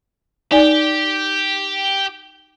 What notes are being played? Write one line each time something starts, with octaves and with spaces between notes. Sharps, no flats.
D#4 G4 D5 G#5